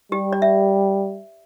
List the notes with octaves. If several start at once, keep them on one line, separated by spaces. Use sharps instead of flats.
G3 G4
D5
E5